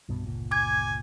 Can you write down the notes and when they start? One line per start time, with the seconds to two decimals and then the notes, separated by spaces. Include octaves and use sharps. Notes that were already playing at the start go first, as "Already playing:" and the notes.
0.09 C2 G2 B2
0.26 G1 C#2 A#2
0.51 G#5 D6 G#6